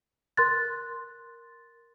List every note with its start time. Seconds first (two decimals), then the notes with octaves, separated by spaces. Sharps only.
0.37 A#4 C6 F#6 A6